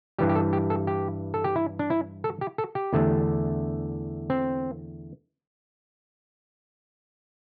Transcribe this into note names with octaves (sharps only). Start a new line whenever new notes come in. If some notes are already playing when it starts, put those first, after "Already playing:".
G2 E3 G3 G4
G4
A4
G4
A4
G4
A4
G4
E4
D4
E4
A4
G4
A4
G4
E2 D3 A3
C4